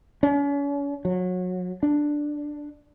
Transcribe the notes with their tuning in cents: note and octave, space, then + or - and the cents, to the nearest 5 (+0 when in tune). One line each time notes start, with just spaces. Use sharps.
C#4 +40
F#3 -25
D4 +5